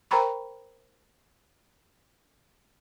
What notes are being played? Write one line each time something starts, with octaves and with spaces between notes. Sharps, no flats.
A#4 C5 G5 A#5 B5 C#6